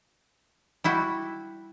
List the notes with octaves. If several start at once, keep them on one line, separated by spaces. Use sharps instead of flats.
G3 E4 F#4